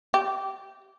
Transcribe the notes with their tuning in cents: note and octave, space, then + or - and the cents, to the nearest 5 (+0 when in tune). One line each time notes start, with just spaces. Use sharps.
G4 -20